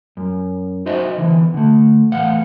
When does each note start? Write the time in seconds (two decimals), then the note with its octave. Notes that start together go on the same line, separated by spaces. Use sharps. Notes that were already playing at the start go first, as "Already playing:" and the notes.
0.17 F#2
0.86 D#4 F#4 C5 D#5 E5
1.18 E2 G#2 D3 E3
1.54 D3 A3
2.12 E2 A2 F5 F#5